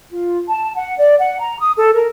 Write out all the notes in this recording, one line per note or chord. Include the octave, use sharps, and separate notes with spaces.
F4
A5
F#5
D5
F#5
A#5
D#6
A4
A#4